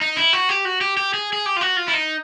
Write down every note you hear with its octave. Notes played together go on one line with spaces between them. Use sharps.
D#4
E4
F#4
G4
F#4
G4
G4
G#4
G#4
G4
F4
F#4
F4
E4
D#4